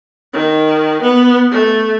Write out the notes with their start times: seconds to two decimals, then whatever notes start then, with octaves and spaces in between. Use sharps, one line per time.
0.33 D#3
1.02 B3
1.52 A3